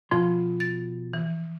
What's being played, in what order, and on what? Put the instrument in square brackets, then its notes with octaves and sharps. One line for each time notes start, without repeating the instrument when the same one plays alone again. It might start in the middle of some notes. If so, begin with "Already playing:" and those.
[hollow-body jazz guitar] B2 F4 C6 [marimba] F3
[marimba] A6
E3